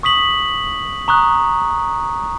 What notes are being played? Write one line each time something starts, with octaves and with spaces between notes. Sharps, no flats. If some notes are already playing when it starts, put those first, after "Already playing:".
C#6 D#6 B6 F#7
A#5 C#6 D#6 F#6